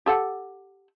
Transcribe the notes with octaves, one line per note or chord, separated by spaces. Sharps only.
G4 A4 F#5